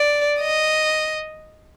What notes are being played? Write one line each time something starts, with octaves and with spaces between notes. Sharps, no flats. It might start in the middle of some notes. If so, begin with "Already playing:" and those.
Already playing: D5
D#5